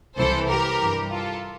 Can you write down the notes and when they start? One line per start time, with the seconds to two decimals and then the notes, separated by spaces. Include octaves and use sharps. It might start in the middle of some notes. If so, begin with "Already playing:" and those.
0.17 C2 C3 E3 A4 C5
0.49 G4 A#4
0.81 G2 E3
1.12 F4 A4